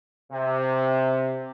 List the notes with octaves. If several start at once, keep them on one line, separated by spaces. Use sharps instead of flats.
C3